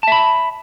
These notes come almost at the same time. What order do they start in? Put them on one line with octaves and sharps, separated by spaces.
A5 E5 B5